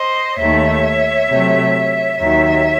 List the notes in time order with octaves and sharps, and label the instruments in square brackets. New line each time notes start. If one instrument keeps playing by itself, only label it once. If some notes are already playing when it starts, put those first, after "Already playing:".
Already playing: [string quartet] C5 D#5
D#2 D#3 A3 C#5 E5
C3 F#3 A3
D#2 D#3 F#3 C#5 E5